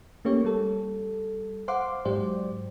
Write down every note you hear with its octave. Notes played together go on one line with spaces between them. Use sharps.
A3 A#3 C#4 G4 C#5
G3 A4
C5 F5 F#5 C6 D6
G#2 F#3 G4 C5 D5